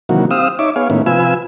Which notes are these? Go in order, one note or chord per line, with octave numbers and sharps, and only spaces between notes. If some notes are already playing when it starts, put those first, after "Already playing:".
C3 D#3 E3 F#3 A#3 F#4
C4 G4 F5 D#6 E6
D#4 C#5 E5 D6
B3 G#4 C#5 F5
A2 D#3 A#3 B3 C#4 E4
C3 F3 F4 B4 G#5 E6